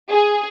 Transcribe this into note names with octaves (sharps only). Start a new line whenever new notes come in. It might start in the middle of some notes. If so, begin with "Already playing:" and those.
G#4